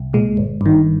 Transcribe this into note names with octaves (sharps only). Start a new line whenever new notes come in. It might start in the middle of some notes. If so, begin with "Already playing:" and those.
Already playing: C2
A#2 G#3
G1
G2 D#3